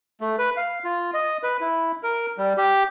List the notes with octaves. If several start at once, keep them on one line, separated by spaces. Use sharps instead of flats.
A3
B4
F5
F4
D#5
B4
E4
A#4
G3
G4